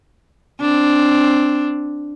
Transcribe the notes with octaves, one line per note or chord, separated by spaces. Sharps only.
C4 D4